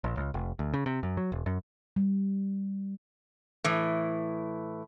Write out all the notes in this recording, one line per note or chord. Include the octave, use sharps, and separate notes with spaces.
A#1
C#2
F1
D2
C#3
C3
F#2
F#3
E1
F#2
G3
A2 E3